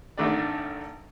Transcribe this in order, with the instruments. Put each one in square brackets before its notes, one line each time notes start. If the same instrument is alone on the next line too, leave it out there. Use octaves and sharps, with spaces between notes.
[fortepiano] G#1 D3 D#3 A3 D4 D5